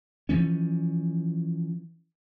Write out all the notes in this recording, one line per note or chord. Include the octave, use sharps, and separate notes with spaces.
E3 F3 C#4